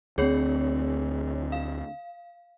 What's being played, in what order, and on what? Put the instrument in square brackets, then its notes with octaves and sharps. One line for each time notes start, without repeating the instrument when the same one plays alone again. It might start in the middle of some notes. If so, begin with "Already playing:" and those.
[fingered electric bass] D2 C4 [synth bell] G#4 C#5
[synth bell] F5